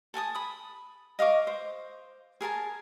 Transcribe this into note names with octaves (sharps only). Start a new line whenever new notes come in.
A4 G#5 A5 D#6
B5 D#6
D#5 F5 C#6 D6
C5
G#4 A#4 G#5 A5